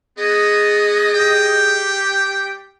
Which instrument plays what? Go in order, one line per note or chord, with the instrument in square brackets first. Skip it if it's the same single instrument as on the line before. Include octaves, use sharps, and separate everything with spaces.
[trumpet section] B3 [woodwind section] G#4 [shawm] D#5
[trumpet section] G3 G5 [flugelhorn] G4